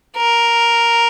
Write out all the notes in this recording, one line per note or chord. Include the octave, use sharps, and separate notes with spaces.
A#4